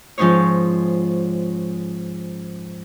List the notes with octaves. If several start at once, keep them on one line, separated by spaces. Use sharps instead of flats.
G#2 F3 C#4 D#4 C5 C#5